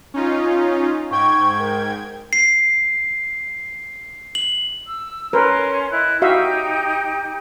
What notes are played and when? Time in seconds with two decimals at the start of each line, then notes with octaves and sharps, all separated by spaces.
0.14 C#4 D#4 F4
1.11 G#2 G5 C#6 G#6
1.59 A#4
2.33 C7
4.35 F#7
4.88 E6
5.33 C#4 A#4 B4 C6
5.91 E4 D#5 F#6
6.22 D#4 F#4 G4 E5 F5 G6